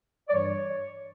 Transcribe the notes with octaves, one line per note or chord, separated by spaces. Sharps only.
D5
G2 E3 G3 C#5